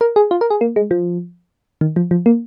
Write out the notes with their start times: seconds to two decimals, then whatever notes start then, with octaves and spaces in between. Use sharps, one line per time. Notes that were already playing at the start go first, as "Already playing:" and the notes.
0.01 A#4
0.16 G#4
0.31 F4
0.41 A#4
0.51 G#4
0.61 A#3
0.76 G#3
0.91 F3
1.81 D#3
1.96 F3
2.11 F3
2.26 A#3